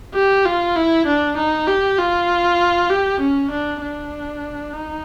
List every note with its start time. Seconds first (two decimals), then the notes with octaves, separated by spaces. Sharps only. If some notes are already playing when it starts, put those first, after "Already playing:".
0.15 G4
0.46 F4
0.76 E4
1.07 D4
1.37 D#4
1.67 G4
1.98 F4
2.90 G4
3.20 C#4
3.51 D4
3.81 D4
4.73 D#4